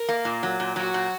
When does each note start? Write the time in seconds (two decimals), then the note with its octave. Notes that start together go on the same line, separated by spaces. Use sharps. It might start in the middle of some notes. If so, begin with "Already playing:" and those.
Already playing: A#4
0.09 A#3
0.25 A#2
0.43 F#3
0.60 A#2
0.76 F#3 F#4
0.94 A#2